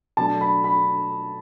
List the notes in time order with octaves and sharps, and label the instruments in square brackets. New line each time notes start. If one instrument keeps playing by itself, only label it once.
[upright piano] B2 F#3 A3 D4 A5
B5
B5